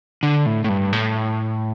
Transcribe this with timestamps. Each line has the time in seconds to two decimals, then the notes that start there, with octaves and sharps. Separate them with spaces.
0.23 D3
0.46 A2
0.64 A2
0.69 G2
0.93 A2